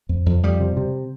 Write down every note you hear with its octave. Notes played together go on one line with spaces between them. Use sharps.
F2
F2
F2 G3
C3
C3